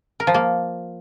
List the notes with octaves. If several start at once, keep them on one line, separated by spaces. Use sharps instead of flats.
A#4
F3
A#3